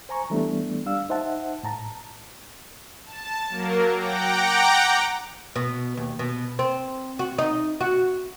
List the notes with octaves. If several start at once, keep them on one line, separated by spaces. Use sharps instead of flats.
C5 G#5 A#5 C#6
E3 G3 A3 B3 D4
G3 D4 F5 E6
D#4 C5 E5 F#5 A5
A2 A5 A#5
A5
F#3 A#3 A#4
F#5 G5 A#5 D6
B2
D#2
B2
C4
F#4
D#4
F#4